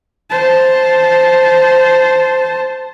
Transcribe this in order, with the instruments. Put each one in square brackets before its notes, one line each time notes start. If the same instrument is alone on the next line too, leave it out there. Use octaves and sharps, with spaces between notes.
[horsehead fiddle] C5 A5